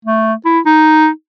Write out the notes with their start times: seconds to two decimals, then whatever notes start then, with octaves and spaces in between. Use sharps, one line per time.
0.05 A3
0.45 E4
0.66 D#4